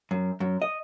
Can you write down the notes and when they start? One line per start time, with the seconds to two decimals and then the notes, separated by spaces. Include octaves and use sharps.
0.11 F#2
0.40 F#2
0.62 D#5